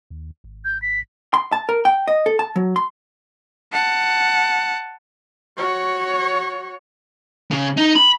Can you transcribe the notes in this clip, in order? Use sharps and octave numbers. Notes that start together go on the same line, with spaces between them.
D#2
G#1
G6
B6
C6
A5
A#4
G5
D#5
A4
A5
F#3
C6
F#5 A5
F#4 C#5
C#3
D#4
B5